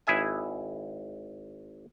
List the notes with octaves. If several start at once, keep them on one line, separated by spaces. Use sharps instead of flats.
G#1 E4 G#4 E5 G#5